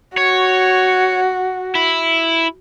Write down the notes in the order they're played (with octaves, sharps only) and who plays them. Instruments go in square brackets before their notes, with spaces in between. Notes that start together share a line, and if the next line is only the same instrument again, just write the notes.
[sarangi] F#4 [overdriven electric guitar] C#5
[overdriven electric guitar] E4